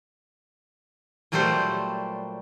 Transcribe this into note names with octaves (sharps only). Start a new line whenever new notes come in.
A#2 F#3 G3 A3 G4 C5